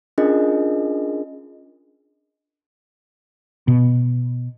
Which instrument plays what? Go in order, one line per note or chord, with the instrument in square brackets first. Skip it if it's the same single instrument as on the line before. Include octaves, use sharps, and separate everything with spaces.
[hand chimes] C#4 D4 F4 G#4 A#4 D#5
[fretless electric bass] B2